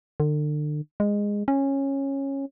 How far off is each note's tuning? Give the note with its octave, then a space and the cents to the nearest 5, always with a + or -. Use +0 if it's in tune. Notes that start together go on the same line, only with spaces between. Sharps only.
D3 +35
G#3 -15
C#4 -15